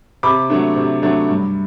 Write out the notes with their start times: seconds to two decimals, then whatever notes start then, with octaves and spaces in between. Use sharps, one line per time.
0.23 C3 B5 D6
0.50 F#3 A3 D4
0.76 C3
1.03 F#3 A3 D4
1.29 G2